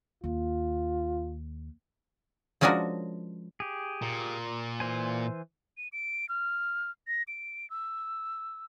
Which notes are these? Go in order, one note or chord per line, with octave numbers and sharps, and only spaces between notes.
D#2 F4
F3 G#3 C#4 D4 F#4 A#4
G4 G#4
A#2
E3 C5 G#5
D#7
D7
F6
A#6
D7
E6